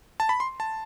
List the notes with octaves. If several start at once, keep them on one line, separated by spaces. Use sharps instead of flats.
A5
B5
C6
A5